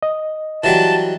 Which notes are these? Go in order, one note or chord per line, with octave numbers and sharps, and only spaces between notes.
D#5
E3 F#3 G3 A5